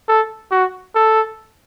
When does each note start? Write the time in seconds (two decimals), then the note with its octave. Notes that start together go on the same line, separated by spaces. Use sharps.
0.08 A4
0.51 F#4
0.95 A4